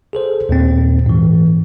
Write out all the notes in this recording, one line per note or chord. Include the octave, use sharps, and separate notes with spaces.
G#4 A4 C5
D#2 A#2 C4
G#2 E3